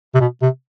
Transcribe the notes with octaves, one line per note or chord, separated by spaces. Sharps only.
C3
B2
C3